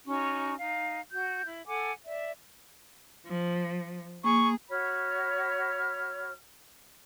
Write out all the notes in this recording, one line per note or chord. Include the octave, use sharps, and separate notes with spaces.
C#4 D#4 F#4 C#6
D#4 F5
F#4 G6
E4
A4 F#5 G#5 D6
D5 E5
F3
A#3 G#4 C#6
F#4 C#5 B5 F6